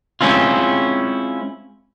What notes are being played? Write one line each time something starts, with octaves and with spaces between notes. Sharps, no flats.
G#3 C4 C#4 E4 F4